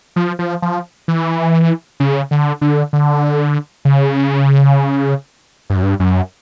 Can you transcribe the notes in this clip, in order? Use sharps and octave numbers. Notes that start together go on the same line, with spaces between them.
F3
F3
F3
E3
C#3
D3
D3
D3
C#3
G2
F#2
G2
F#2